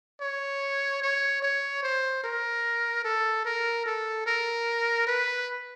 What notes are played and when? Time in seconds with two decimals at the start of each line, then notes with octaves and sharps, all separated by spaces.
0.21 C#5
1.02 C#5
1.42 C#5
1.83 C5
2.24 A#4
3.05 A4
3.45 A#4
3.86 A4
4.26 A#4
5.07 B4